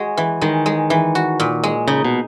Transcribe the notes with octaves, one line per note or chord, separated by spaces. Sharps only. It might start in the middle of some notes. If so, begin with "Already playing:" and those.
Already playing: G#3 F#4
E3
D#3 G#3
G#3
E3
F#4
A#2
G#3
C#3 D#4
B2